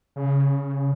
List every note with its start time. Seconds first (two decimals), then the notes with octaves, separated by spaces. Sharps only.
0.16 C#3